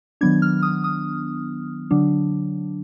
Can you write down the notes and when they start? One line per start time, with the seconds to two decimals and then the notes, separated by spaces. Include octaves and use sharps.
0.21 D#3 F#3 B3 D4 G#6
0.42 F6
0.62 D#6
0.84 D#6
1.91 D3 F#3 D4